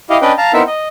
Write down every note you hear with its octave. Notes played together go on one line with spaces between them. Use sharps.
E4 G4 D#5 F5
C#4 D4 B4 D#5 G5
F5 A5 A#5
B3 C4 D#4 E4 A#4 E5
D#5